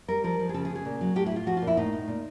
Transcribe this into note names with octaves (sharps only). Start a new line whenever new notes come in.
G3 A#4
F3 A#4
F3
G#4
C#3 A4
G#4
C#3
G#4
A#2
F#3
A2 G4
E4
A2 F4
F3 F#4
F4
A#2
E4
A2 D#4
A2
A#2